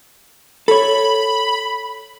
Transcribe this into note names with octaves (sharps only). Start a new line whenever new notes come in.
A4 C#5 B5